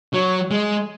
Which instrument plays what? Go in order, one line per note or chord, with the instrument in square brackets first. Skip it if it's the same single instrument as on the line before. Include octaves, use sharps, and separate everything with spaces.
[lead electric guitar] F#3 [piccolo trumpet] C#5
[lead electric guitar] G#3